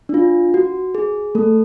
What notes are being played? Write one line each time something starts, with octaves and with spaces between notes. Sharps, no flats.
D4
F4
F#4
G#4
A3 A4